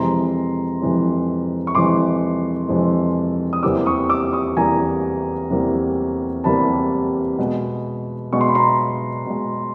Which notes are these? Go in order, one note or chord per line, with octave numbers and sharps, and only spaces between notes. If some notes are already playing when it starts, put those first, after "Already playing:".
Already playing: F2 C3 E3 G#3 A#5 C6
F2 C3 E3 G#3
C#6
F2 C3 E3 G#3 C6 D6
F2 C3 E3 G#3
D#6
E2 C3 E3 G3 A#3 D6 E6
C#6 D#6
D6 E6
C#6 D#6
E2 C3 E3 G3 A#3 G#5 A#5
E2 C3 E3 G3 A#3
E2 C3 E3 G3 A#3 A5 B5
B2 G#3
B2 G#3 C#6
C6
B5
A#5 C6
B2 G#3